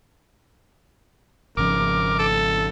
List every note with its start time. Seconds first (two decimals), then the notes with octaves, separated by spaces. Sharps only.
1.57 G#1 C#3 F3 A#4 D6
2.19 A4